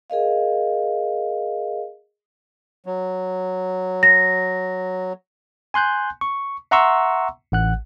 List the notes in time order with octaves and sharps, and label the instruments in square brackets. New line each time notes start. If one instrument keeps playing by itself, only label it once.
[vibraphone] G#4 A#4 D#5 F5
[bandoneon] F#3
[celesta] A#6
[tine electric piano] G#5 C6 F#6 G6
C#6
E5 F#5 A#5 C6 C#6 E6
A1 F#5 F#6